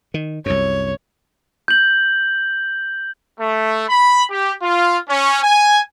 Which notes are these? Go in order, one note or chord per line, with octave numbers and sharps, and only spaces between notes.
D#3
C2 F#2 C#5
G6 F#7
A3
B5
G4
F4
C#4
G#5